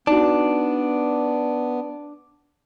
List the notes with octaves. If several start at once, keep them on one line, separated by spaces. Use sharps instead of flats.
B3 D4 D#4 F#4